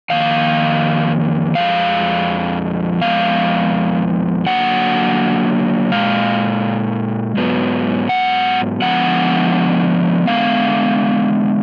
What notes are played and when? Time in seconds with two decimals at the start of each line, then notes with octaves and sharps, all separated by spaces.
0.10 F2 D#3 A#3 F5
1.55 F2 F3 G#3 F5
3.01 F2 F3 G#3 B3 F5
4.46 D3 F#3 A#3 F#5
5.92 A#2 G#3 F5
7.37 G#2 F#3 B3
8.09 F#5
8.82 D3 F3 G#3 B3 F#5
10.27 D3 G#3 B3 F5